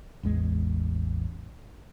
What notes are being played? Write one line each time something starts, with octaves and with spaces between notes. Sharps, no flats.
A1 E2 G#3